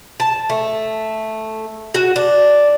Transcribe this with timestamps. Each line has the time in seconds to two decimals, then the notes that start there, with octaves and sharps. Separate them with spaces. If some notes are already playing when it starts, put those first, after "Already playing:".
0.20 A5
0.50 A3
1.94 F#4
2.16 D4